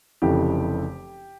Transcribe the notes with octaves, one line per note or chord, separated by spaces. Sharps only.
F1 F2 C#3 E3 G4